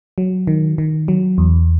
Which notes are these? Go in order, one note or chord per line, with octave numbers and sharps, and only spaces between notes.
F#3
D#3
D#3
F#3
E2